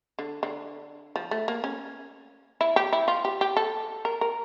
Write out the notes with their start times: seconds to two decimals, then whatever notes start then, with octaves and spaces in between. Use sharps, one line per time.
0.19 D3
0.43 D3
1.16 F3
1.31 A3
1.48 A#3
1.64 C#4
2.61 E4
2.76 G4
2.93 E4
3.08 F4
3.25 G4
3.41 G4
3.57 A4
4.05 A#4
4.21 A#4